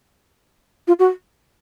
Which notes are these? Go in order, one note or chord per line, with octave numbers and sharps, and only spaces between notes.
F4
F#4